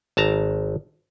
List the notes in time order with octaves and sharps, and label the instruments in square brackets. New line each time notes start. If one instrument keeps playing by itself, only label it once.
[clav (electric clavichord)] G#1 A5 A#5